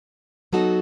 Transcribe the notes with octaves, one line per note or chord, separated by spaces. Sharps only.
F#3 B3 D#4 F#4 A4